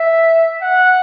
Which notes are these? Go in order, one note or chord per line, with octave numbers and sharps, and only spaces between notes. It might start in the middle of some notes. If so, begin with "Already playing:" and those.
Already playing: E5
F#5